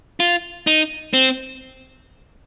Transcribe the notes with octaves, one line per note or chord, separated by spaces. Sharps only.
F4
D#4
C4